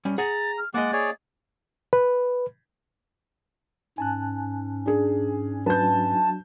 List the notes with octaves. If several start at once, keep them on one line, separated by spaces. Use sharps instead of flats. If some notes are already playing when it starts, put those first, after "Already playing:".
G3 C#4
G#4 F#5 A#5 A6
F6
G#3 A#3 D#5 F#5 D6 A6
G#4 C#5 D5
B4
G#2 C#4 G#5 A5 F#6
D4 G#4
F#3 D4 F#4 B4 A5 G6